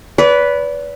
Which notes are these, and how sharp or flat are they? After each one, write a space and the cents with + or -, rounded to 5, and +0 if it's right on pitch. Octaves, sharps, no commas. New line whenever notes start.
B4 +0 D5 -35